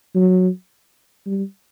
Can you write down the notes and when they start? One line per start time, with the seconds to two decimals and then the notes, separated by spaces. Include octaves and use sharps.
0.15 F#3
1.26 G3